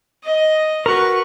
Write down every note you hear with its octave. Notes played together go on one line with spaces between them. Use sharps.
D#5
F#4 A#4 B4 C#6